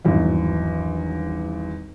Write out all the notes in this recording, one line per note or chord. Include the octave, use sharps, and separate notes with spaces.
G#1 E2 G2 F#3